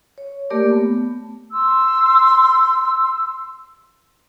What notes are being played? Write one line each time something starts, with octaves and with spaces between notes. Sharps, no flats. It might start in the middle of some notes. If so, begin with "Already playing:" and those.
C#5
A3 A#3 G4 A#4 D5 D6
A3 B3
C6 E6